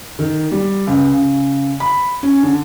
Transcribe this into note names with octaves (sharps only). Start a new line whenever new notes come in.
D#3
G3
C#2
C#3
B5
C#4
D3